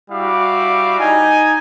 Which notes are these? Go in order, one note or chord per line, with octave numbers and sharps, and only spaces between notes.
G3 E4 F#4 F5 D6
D#4 D#5 G#5